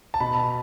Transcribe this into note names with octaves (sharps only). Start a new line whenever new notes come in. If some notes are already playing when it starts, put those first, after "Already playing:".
A5
B2 B5